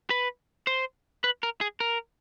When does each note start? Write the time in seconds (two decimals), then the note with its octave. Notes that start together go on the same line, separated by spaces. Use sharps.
0.10 B4
0.67 C5
1.24 B4
1.43 A#4
1.61 G#4
1.80 A#4